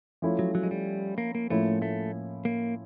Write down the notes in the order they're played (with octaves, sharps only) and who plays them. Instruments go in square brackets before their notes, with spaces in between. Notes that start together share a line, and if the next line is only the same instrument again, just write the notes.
[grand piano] F3 A3 C#4 E4
[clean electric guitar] F#3
F#3
G#3
G3
A#3
A#3
[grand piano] A2 F3 A#3 C#4 E4 [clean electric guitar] A3
[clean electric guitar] A3
A#3